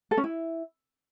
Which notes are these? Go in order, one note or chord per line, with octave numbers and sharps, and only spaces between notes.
A4
C#4
E4